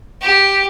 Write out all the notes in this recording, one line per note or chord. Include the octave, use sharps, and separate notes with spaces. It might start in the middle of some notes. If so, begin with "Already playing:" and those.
G4